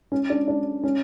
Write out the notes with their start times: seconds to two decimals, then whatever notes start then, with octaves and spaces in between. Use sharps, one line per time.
0.12 C#4
0.30 D4
0.48 D4
0.84 C#4